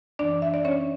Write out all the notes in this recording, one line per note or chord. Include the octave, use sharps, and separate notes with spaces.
F#2 E3 D4 D5
E5
D5
C#4 C#5